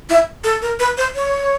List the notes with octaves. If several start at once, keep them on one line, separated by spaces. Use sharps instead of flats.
E4
A4
A#4
B4
C5
C#5